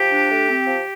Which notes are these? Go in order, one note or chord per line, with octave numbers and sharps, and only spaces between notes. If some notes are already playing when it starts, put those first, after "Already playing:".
Already playing: F3 G4
D4
A3
C4
F3